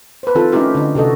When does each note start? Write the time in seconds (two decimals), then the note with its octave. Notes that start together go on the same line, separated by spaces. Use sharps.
0.23 B4 C5
0.35 D#3 C4 F4 A4
0.52 A3 C#4 D#4 E4 G4 A#4
0.75 D3 D#4
0.95 C3 F#4 A4 D#5